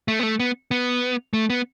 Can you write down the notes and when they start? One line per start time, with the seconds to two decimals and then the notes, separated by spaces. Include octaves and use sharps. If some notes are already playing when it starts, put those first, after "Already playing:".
0.08 A3
0.19 B3
0.23 A3
0.40 B3
0.71 B3
1.33 A3
1.50 B3